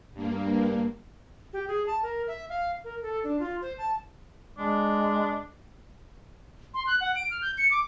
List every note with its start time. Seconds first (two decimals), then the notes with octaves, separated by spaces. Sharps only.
0.14 G2 A#3
1.53 G4
1.68 G#4
1.87 A5
2.03 A#4
2.28 E5
2.49 F5
2.84 A#4
3.02 A4
3.24 D4
3.40 F4
3.62 C5
3.78 A5
4.58 G#3 D4
6.74 C6
6.87 F#6
7.01 F#5
7.15 D7
7.30 F6
7.42 G6
7.58 C#7
7.71 D6